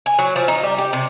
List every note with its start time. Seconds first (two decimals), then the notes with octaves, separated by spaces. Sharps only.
0.06 G#5
0.19 F#3
0.36 F3
0.48 D#4
0.63 G3
0.78 G4
0.93 C3